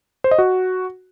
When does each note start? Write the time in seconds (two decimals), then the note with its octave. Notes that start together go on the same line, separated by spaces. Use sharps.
0.24 C5
0.31 D#5
0.38 F#4